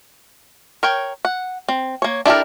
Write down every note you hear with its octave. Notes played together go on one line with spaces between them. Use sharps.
A#4 C#5 G5
F#5
C4
A#3 C#5
D4 E4 G4 A4 A#4